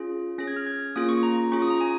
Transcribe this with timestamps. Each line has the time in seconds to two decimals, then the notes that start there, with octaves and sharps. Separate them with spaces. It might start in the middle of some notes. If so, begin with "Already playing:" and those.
Already playing: C#4 F4 G#4
0.38 C#4 G#4 A#6
0.47 G#6
0.56 F6
0.67 G#6
0.96 A#3 C#4 F4 G#4 D#6
1.09 C#6
1.23 A#5
1.52 C#4 F4 G#4 C#6
1.62 D#6
1.70 A#5
1.81 G#5